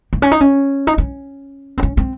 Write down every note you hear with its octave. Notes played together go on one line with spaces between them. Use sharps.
A#3
C#4
D#4
C#4
D#4
C#4
C4
C#4
C4